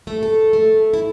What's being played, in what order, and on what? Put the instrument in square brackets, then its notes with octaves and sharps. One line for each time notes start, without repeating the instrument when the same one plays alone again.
[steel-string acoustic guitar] A3 A4
A4
A3
E4